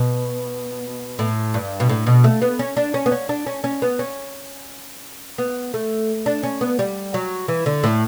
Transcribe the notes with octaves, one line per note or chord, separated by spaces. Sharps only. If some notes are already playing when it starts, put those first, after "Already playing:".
Already playing: B2
A2
G2
B2
A2
B2
A3
B3
C#4
D4
C#4
B3
C#4
D4
C#4
C#4
B3
C#4
B3
A3
D4
C#4
B3
G3
F#3
E3
D3
A2